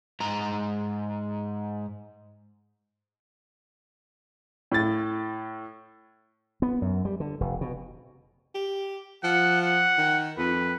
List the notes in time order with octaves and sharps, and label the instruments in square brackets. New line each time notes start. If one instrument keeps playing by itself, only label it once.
[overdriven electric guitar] G#2 A#5
[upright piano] A2 A6
[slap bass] B3
F#2
G3
D3
F1
B2
[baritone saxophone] G4
[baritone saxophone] F3 [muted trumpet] F#5
[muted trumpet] F#5
[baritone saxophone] D#3
[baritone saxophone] F2 [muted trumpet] B4